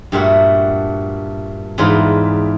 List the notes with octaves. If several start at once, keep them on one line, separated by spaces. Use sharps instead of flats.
G2 A#2 A3 F#4
E2 G#2 D4 F4 B4